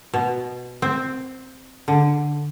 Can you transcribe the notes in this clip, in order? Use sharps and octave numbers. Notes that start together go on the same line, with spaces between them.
B2
C4
D3